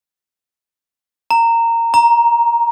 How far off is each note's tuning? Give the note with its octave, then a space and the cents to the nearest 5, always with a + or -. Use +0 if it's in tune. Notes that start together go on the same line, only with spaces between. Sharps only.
A#5 -15
A#5 +10